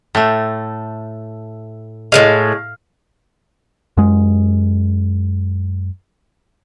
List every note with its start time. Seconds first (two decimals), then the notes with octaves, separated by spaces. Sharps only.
0.15 A2 A3
2.12 A2 F3 G#3 F5
3.97 F#2 G#3